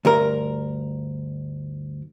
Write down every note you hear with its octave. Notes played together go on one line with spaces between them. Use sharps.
D2 G2 A#4